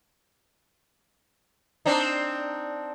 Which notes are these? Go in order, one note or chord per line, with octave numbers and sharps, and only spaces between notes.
C4 D4 D#4